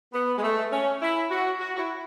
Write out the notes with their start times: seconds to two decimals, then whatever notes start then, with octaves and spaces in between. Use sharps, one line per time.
0.13 B3
0.38 G#3
0.43 A3
0.72 C#4
1.02 E4
1.31 F#4
1.60 F#4
1.76 F#4
1.79 E4